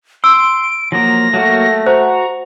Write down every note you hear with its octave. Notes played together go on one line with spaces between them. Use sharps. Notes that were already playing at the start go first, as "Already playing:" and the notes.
C6 E6 D7
F3 F#3 A#3 A#6
F#3 A3 A#3 F#4
F#4 C5 A#5